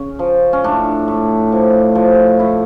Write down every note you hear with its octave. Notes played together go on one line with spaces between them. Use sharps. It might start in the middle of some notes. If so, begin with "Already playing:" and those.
Already playing: C#3 C#4
F3
C#4
A2 D4
A2
F3
F3
A2 E4